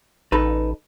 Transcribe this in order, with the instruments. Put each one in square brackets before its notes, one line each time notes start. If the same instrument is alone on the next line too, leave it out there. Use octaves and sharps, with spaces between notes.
[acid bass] A1 [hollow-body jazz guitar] D#4 A4 B4